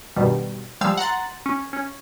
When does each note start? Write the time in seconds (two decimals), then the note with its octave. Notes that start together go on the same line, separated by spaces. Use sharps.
0.16 G2 B2 D#3 G3
0.81 F3 G3 G#3 F5 E6
0.97 F#5 A#5 C6 A6
1.46 C#4
1.73 C#4